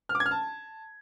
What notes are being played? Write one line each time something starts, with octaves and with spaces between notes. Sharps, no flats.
F6
D6
G#6
F6
A5